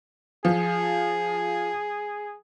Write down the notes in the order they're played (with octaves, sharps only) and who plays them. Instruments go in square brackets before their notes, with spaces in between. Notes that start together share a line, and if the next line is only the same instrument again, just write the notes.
[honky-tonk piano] F3 [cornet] G#4